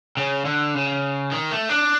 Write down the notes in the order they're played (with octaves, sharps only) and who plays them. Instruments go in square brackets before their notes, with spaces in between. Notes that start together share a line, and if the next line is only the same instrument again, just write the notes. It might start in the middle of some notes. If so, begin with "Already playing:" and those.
[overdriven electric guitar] C#3
D3
C#3
D#3
A3
D4